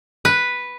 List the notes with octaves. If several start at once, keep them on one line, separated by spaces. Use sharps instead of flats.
B4